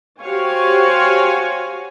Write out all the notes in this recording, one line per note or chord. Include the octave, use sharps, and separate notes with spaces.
F#4 G4 C5 C#5 F5 G#5